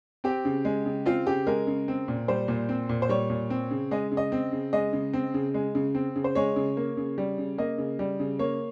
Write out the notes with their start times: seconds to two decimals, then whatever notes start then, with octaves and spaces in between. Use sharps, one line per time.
0.24 C4 G4
0.45 C#3
0.65 G#3
0.86 C#3
1.06 C4 F4
1.27 C#3 G4
1.47 G#3 A#4
1.67 C#3
1.88 C4
2.08 A#2
2.28 G3 C5
2.48 A#2
2.69 C4
2.89 A#2
3.02 C5
3.09 G3 C#5
3.30 A#2
3.50 C4
3.71 C#3
3.91 G#3 D#5
4.12 C#3
4.17 D#5
4.32 C4
4.53 C#3
4.73 G#3 D#5
4.93 C#3
5.13 C4
5.34 C#3
5.54 G#3
5.75 C#3
5.95 C4
6.16 C#3
6.24 C5
6.35 G#3 C#5
6.56 C#3
6.77 A#3
6.97 C#3
7.18 G3
7.38 C#3
7.58 A#3 D#5
7.78 C#3
7.99 G3
8.20 C#3
8.39 A#3 C#5